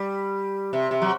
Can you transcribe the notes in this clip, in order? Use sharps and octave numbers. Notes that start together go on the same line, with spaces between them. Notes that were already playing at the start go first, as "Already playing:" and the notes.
Already playing: G3
C3
C3
F#3